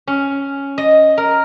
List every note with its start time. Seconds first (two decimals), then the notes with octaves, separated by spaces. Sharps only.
0.07 C#4
0.78 D#5
1.17 A#4